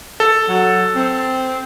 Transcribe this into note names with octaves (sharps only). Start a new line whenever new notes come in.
A4
F#3
C4